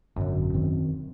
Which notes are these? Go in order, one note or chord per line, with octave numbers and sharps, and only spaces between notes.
G#1 F#2 B2 D3
E1 D#3 C4